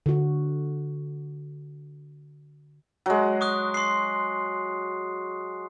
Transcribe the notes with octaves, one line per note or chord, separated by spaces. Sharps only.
D3 F#4
F#3 G#3
C#6 D#6 F#6
C6 C7